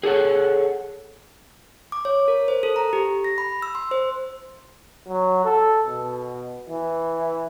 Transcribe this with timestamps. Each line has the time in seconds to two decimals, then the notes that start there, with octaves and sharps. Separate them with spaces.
0.03 G#4 A4 C#5 F#5
1.92 D6
2.05 C#5
2.28 A#4
2.48 C5
2.63 A4
2.76 A#5
2.93 G4
3.24 A#6
3.38 B5
3.62 E6
3.75 C6
3.91 C5
5.08 F#3
5.45 A4
5.87 B2
6.70 E3